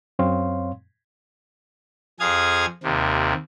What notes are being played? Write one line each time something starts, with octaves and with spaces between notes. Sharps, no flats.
F#2 C4 C#5 F5 C6
F2 G#4 F5 D#6 G#6
D#2 C3